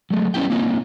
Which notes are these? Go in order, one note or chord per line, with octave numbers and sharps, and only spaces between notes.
F#3 G#3 A3
G3 B3 C#4 E4 G4 G5
A#3 C4 C#4 D#4 F4